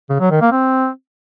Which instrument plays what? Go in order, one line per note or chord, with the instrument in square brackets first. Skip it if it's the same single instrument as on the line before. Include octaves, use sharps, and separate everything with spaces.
[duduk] C#3
F#3
D#3
A#3
C4